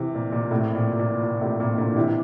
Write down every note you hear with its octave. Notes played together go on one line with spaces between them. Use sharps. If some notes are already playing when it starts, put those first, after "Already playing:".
Already playing: C3 E3
A#2
A#2
A2 C3
A#2
A#2
A#2
A2 C3
A#2
A#2 D3
C3 E3